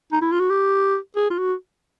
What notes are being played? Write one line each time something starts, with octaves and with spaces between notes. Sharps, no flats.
D#4
E4
F4
F#4
G4
G#4
F4
F#4